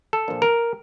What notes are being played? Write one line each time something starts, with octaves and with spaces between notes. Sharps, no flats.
A4
A#2 F3 A#3 D4
A#4